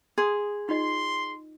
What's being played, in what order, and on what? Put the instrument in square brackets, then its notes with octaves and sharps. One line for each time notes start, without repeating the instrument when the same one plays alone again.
[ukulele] G#4 [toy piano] C6 D#6
[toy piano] D#4 F4 D#5 [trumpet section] C6